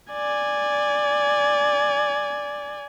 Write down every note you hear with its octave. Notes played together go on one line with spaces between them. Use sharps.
D5 G#5